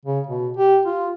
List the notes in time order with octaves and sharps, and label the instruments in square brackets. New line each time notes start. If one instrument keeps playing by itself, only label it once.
[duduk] C#3
B2
G4
F4